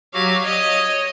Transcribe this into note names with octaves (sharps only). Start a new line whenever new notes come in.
F#3 F#4 G4 F5
C#5 D#5